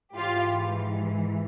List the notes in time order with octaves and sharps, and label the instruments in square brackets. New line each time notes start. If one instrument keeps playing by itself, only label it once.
[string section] G#2 E3 F4 G4